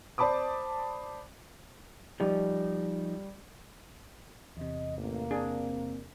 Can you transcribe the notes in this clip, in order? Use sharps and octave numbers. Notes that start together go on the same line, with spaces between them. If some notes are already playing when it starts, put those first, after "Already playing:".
C5 D5 A5 B5 D6 D#6
F3 G3 D#4
E2 C3 D#5
A1 A#3
C4 D4 G#4